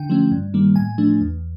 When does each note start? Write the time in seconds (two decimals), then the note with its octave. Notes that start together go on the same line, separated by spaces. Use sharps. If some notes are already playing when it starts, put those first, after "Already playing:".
Already playing: D3 G5
0.10 F3 A3 C#4
0.32 G2
0.54 D#3 G3 A#3
0.75 A2 G#5
0.98 F3 A3 D4
1.21 E2